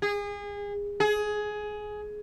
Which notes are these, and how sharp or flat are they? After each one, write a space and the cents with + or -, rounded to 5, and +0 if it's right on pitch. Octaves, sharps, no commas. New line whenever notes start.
G#4 -30
G#4 +15